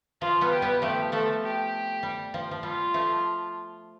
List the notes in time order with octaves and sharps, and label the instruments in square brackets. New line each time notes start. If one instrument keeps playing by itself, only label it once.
[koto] F3 [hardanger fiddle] F4
[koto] G3 B3
[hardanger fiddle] G4
[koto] G3 B3
[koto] F3 A3 [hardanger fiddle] G4
[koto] F3 A3 [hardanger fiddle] A4
[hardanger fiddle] G4
[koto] G3
F3
F3
[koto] G3 [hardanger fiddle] F4
[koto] F3 A3